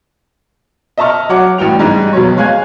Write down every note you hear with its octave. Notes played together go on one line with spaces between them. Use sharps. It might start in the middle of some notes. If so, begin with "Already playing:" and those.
D#5 E5 A5 A#5 C#6 F6
F#3 C#5 F#5 D6
A1 G2 E3 F#4 G5 F7
G#2 G3 G#3 D#4
F2 B2 F#3 C#5
G#3 C#5 F5 G#5 F#6 G#6